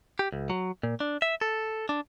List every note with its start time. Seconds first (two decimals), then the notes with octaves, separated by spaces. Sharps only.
0.19 G4
0.32 C#2
0.50 F#3
0.83 A#2
1.00 D4
1.22 E5
1.41 A4
1.89 D4